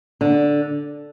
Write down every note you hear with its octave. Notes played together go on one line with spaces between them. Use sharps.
D3